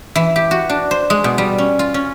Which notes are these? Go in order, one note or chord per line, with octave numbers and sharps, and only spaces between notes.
E3
G4
F#4
D4
C5
G#3
B2
G3
C#4
F4
C#4